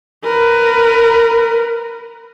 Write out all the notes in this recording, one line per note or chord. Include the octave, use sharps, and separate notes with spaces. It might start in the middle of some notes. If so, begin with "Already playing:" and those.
A#4 B4